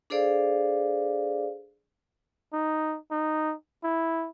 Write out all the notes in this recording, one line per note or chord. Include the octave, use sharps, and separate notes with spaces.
D4 G#4 A4 C5 D5 F5
D#4
D#4
E4